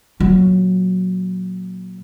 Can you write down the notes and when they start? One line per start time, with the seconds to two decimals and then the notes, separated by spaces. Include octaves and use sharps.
0.20 A#2 F#3